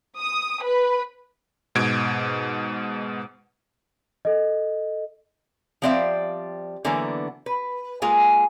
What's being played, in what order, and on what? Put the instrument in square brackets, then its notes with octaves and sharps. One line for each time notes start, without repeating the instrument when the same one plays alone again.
[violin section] D#6
B4
[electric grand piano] G#2 B2 G#6 D7
[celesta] A4 D#5
[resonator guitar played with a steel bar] F3 G3 C4 D5 E5 F5
D3 E3 F#3 A#3 B3
B4
G#3 A#3 F4 G#4